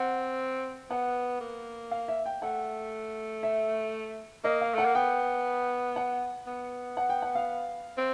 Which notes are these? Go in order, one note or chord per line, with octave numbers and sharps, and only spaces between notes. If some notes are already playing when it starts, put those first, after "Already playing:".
Already playing: C4 F#5
B3 F#5
A#3
F5
E5
G5
A3 F#5
E5
A#3 D#5
F5
A3 F#5
A#3
B3 G5
F#5
B3
F#5
G5
F#5
F5
C4